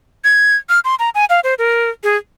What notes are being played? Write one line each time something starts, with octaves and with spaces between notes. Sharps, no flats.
G#6
F6
C6
A#5
G#5
F5
C5
A#4
G#4